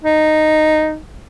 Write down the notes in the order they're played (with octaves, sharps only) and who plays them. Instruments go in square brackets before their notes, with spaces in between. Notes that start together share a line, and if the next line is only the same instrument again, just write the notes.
[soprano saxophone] D#4